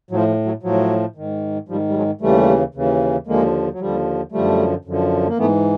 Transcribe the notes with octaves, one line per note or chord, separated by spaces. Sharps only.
A2 F3 F#3
F3
F#3
A2 F3 F#3
G#2 D#3
G#2 D#3 F3 G3
G3
F#3 G#3
D#2 C#3 E3 G3 A3
D#2 C#3 E3
D#2 D3 F3 G#3 A#3
F#3
D#2 D3 F3 G3
F#2 D3 F3 G3 A3
F#2 D3 F3
A#3
G#2 E3 A3 B3